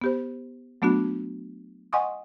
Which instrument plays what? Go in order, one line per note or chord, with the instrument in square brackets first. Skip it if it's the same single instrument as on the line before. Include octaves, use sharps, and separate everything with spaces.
[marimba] B3 G4 C5
F#3 A3 B3 D4 F#4
D#5 F#5 G#5 C6 C#6 D#6